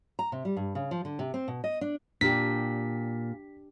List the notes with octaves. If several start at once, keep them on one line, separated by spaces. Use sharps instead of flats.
A#5
C3
G3
G2
C#3
F3
D3
C3
C4
B2
D#5
D4
A#2 D4 G4 B6